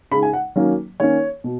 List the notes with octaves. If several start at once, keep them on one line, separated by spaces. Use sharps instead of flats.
C#3 G#3 D#4 B5
G#5
F#5
D#3 F#3 A#3 C#4
D#3 A#3 C#4 C#5
B2